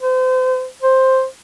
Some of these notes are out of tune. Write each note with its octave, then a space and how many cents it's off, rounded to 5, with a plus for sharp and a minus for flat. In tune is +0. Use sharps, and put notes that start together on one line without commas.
C5 -35
C5 +5